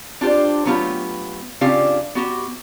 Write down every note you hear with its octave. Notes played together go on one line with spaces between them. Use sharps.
D4 F4 G4 C5
F#3 A3 B3 F4 G4
C#3 C4 D4 F4 G4 F5
B3 F#4 G4